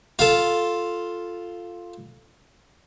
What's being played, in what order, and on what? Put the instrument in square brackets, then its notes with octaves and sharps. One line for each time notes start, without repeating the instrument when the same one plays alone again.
[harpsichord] F4 A4